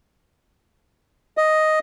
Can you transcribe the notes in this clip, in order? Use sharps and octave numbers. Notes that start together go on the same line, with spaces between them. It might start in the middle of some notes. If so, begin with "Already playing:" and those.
D#5